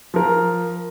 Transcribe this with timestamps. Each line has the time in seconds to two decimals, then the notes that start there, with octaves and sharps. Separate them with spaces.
0.14 F3 A#4